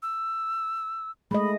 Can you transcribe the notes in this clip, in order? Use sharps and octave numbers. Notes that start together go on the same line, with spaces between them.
E6
G#3 A3 D#5 B5